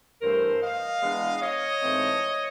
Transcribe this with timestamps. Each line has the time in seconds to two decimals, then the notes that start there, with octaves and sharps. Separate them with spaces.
0.21 G2 E3 A3 A#4 C5
0.61 D#5 F5
1.01 E3 G#3 B3 D4
1.41 C#5 D#5
1.82 G#2 E3 A3 C4